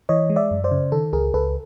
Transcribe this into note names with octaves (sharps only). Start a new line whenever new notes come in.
E3 C#5 D#5
G#3
D5 E5
F#2
C5 D5
C#3
D#3 A4
C#2 G#4 A#4
C#2 A4 B4